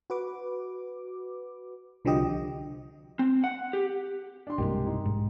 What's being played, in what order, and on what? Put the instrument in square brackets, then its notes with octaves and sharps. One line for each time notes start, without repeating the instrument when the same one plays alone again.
[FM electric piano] F#4 B4 D6
C2 D3 F3 F#4 G4 D#5
[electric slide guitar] C4
F#5
G4
[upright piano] D4 C6
[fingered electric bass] B1 G2 C3 [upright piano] G#3 A#3 G4
[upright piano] D#4
[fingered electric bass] B1 G#2 G#3